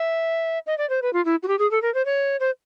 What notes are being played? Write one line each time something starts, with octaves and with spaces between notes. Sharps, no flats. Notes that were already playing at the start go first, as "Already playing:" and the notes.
Already playing: E5
D#5
D5
C5
B4
F4
E4
F#4
G4
G#4
A4
A#4
C5
C#5
C5